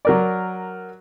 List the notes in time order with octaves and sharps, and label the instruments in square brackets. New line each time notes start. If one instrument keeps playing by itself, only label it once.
[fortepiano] F#3 A#4 D5